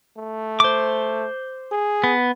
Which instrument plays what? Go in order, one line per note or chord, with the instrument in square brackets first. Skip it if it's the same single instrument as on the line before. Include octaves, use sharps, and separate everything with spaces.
[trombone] A3
[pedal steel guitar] C5 D6
[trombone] G#4
[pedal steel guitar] B3